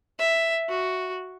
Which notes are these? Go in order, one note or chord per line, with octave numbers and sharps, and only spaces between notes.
E5
F#4